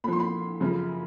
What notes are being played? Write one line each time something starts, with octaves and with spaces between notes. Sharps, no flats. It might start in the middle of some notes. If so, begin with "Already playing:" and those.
A#2 F3 B5 C6
B5
F#2 C#3 F3